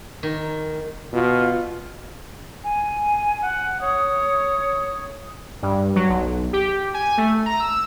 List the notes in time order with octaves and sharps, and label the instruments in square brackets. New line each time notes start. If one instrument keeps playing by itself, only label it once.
[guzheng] D#3
[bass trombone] B2 [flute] F4
[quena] G#5
F#5
[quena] C#5 [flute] D#6
[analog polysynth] G2
F#3
B1
G4
G#5
A3
A#5
E6